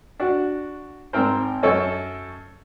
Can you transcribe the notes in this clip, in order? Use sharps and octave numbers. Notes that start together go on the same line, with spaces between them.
D4 F#4
G#1 C4 A#4 C5
F#2 A4 C#5 D#5